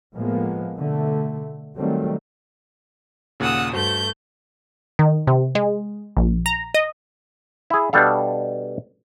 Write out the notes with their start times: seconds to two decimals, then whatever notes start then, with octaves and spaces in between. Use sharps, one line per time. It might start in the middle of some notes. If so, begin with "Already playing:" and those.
0.15 A2 F3 G#3 A#3 B3
0.78 B2 D3 A3
1.76 D#3 F#3 G3 A3 C4
3.40 D#2 A#2 C#3 F#5 D#6 E6
3.73 G2 A3 F#4 C5 G6
4.99 D#3
5.27 C3
5.55 G#3
6.17 A#1
6.46 A#5
6.74 D#5
7.70 E4 G#4
7.93 B2 G3 D4 A4 F5